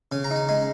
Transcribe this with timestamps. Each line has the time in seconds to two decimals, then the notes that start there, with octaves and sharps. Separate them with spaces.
0.12 C#3 G#5
0.24 A#5
0.31 D#4
0.36 G#5
0.49 G#3 G#5